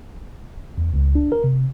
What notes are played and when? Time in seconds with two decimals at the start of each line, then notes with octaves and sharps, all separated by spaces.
0.78 E2
0.94 C#2
1.15 D4
1.32 A#4
1.44 C3